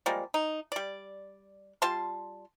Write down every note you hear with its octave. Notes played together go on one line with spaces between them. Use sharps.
F3 G3 G#3 A#3
D#4
G3 D5
G3 F4 A5 C6